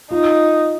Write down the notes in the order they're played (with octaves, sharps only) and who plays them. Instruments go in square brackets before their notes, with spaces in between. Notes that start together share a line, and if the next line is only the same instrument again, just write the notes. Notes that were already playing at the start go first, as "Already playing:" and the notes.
[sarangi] D#4 [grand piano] F4